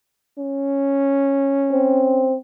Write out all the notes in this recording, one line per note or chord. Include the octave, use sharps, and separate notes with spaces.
C#4
C4